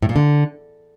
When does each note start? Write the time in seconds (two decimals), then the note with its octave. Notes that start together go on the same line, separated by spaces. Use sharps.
0.02 A2
0.09 A#2
0.16 D3